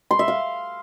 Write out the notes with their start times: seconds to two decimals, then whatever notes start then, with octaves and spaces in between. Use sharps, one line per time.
0.11 C6
0.19 E5
0.28 F5